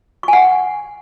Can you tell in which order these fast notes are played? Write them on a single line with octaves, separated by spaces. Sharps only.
C#6 G#5 F#5